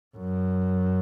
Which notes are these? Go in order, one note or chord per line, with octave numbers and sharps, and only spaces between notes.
F#2